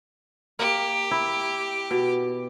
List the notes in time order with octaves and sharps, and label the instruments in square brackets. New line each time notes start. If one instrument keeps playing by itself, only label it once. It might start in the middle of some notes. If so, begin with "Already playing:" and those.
[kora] A#3 [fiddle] G4
[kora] E4
B2